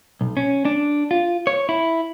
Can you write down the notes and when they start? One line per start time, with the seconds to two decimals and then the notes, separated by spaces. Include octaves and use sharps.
0.21 B1
0.37 C#4
0.65 D4
1.11 F4
1.47 C#5
1.69 E4